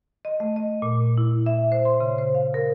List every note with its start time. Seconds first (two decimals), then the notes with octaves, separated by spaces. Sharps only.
0.25 D#5
0.40 A3
0.56 D#5
0.82 A#2
1.18 E4
1.46 E5
1.72 C5
1.85 C6
2.00 C#3
2.18 C5
2.35 F5
2.54 A#4